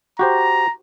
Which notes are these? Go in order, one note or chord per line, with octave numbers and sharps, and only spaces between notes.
F#4 G4 C5 A#5